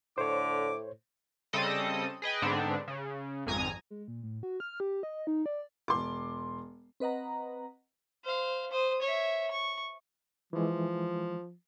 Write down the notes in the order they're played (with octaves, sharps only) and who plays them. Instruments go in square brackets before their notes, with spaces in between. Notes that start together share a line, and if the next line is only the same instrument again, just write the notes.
[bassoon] A2 [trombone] D3 [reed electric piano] C5 C#5 [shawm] D6
[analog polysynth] C#3 G3 C4 A4 D#5 D#6
G#4 B4 D#5 G5
G#2 D3 B3 C4 D4
C#3
G#1 F2 G#5 A#5 D#6
[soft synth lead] G#3
A#2
A2
F#4
F6
G4
D#5
D#4
D5
[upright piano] E1 C6 D6
[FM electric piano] C4 B4 D#5 F#5 A#5
[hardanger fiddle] C5 F5
C5 D#6
C#5 E5
C#6
[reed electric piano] E3 G#3 [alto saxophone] F3